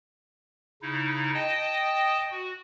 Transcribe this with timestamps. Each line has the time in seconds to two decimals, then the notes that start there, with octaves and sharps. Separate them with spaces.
0.82 C#3 D#4 E4
1.34 D#5 G5 A5 D#6
2.31 F#4